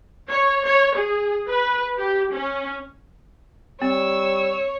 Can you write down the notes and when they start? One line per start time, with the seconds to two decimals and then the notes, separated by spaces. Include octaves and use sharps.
0.30 C#5
0.65 C#5
0.96 G#4
1.47 B4
1.98 G4
2.31 C#4
3.82 G3 C4 C#5 E6